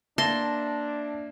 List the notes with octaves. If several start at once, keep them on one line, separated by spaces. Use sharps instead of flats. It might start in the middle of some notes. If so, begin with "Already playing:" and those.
A#3 D4 E5 A5 C6 A#6